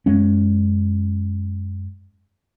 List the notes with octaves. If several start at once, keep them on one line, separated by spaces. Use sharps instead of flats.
F#2 G#3 C#4